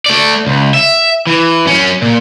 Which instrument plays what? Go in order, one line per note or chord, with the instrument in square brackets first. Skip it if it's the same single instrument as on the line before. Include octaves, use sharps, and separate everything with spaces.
[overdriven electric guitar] A3 D5
C#2
E5
E3
F#2 C#4
A#2